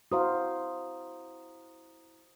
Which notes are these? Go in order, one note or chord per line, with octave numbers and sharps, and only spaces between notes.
E4 F#4 C5 F5 A#5 D#6